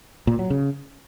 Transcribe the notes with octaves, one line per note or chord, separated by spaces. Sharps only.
A#2
F#3
C#3